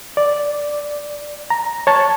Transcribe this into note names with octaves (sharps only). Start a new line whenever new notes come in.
D5
A#5
C#5 A5